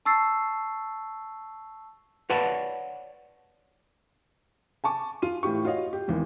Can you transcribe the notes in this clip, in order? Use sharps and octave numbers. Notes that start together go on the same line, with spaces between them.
A5 C#6 E6 A6 C7
B4 C#5 D5 F#5 A5 B5
G#5 A5 C#6 D6
F4 D#7
A2 E3 F4 G4 C#6
F4 F#4 C#5 D#5 F5
G4
G#1 E2 G#2